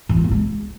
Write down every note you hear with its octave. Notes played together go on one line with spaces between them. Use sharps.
E3
F4
A#3
G#3